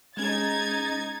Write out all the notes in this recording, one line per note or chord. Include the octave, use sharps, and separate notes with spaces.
G#3 C#4 D#4 G#4 G#6 A6